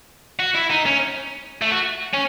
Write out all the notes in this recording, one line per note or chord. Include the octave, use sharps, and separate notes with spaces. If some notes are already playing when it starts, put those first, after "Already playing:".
F#4
E4
D#4
C#4
A3
F#4
C#4